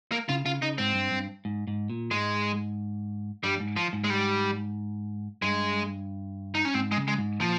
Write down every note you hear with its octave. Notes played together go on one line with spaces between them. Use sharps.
A#3
C#3 F4
C#3 F4
C#3 D#4
G#2 C4
G2
G2
G#2
G#2
A#2
G#2 G#3
G2 G3
G#2
F3
G#2
G#3
G3
G2 G#3
D#4
C#4
G#2 C4
G#3
C#3
G#3
G#2
A#2 F3